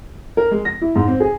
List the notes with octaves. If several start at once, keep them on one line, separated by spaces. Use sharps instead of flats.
A#4
G#3
A#6
E4
G#2
C4
G#4